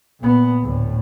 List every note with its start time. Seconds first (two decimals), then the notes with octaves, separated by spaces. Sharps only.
0.20 A#2 B3
0.63 D2 A2